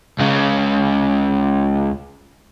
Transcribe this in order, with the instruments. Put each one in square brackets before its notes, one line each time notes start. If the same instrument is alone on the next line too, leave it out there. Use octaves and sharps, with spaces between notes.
[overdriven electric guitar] C#2 C#3